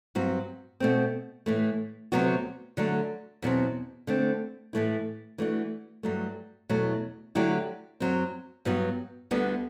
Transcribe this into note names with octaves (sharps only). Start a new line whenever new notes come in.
G2 F#3 C4 F#4
B2 A3 C4
A2 E3 A3
D2 C3 F#3 B3 F#4
D3 F#3 A3
E2 B2 F#3 C4
D3 A3 C4
A2 E3 A3 E4
E3 A3 D4 F#4
G2 F#3 A3
E2 B2 F#3 A3
D3 F#3 A3 E4 G4
F#2 F#3 C4
G2 F#3 B3 F#4
D2 D3 G3 B3